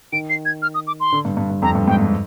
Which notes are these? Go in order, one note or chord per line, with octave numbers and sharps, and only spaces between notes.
D#3 D7
C7
G#6
F6
D#6
D6
C6
D3
G2
G2
G2
F2 A#5
G2
G#2 G5
G2